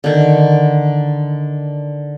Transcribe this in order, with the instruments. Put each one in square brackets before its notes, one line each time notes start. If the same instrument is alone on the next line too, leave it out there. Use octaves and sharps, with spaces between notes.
[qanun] D3 D#3